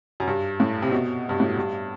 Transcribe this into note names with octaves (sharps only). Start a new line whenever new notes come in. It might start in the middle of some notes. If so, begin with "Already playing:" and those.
F#2
G2
A2
C3
B2
G2
A2
G2